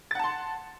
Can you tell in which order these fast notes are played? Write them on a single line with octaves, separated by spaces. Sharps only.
A6 F#5 A5 C6